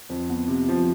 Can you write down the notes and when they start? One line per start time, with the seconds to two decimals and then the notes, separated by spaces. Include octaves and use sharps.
0.10 F2
0.30 B3
0.48 C3
0.69 F3